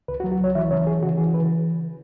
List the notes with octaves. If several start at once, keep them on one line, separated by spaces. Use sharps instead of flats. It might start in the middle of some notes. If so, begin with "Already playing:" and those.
C#2 B4
F#4
F#3
F#4
C#2 C#5
E3 E5
C#3 C#5
E3 G#4
C#3 F#4
E3 G#4
E3 B4